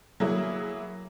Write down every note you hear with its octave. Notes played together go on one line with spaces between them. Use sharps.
F#3 A#3 E4 G#4